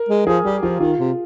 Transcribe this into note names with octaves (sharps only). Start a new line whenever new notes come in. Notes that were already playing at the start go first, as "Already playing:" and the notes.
Already playing: A#4
G#3
F3 G#4
G3 G4
F3 F4
D#3 F4
C3